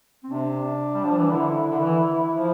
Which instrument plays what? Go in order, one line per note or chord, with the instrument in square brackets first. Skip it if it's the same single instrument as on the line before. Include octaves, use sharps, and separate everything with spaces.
[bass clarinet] C4
[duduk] C3 [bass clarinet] D4
[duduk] G3
F3
E3
[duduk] D3 [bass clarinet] E4
[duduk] D3
E3
F3